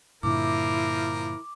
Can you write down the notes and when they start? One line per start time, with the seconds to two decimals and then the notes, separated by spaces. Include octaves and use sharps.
0.23 G2 A#2 D3 F3 E4 A#4 D6